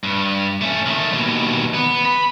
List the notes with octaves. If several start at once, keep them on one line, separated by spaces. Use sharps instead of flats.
G2
A3 C#4
D#3 A3
D#2 B2
B3
B5